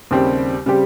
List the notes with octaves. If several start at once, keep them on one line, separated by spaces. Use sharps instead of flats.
D#2 C#3 G3 C4 G4
C#3 G3 C4 G4